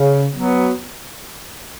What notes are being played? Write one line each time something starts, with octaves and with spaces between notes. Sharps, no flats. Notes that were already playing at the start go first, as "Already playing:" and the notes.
Already playing: C#3
F#3 B3